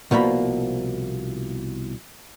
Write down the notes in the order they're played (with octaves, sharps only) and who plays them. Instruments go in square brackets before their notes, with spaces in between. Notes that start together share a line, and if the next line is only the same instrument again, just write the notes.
[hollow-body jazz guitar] C2 B2 F3 A#3 B5